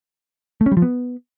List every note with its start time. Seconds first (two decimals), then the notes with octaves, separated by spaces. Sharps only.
0.61 A3
0.66 C#4
0.72 G3
0.77 F3
0.82 B3